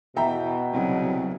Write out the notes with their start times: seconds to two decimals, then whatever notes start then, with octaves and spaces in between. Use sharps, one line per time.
0.16 E2 B2 E3 E5 G5 A#5
0.73 C2 C#3 F#3